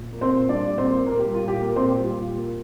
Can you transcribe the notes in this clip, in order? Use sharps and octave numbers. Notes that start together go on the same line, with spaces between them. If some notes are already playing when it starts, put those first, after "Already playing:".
Already playing: A#2
A#3
C4 C5
A#2
G3 D4 D5
A#2
C4 C5
A#3
A#2 A#3 A#4
G4
G3
F4
A#2 G4
A#3 A#4
A#2 C4 C5
G4
G3 F4
A#2
A#3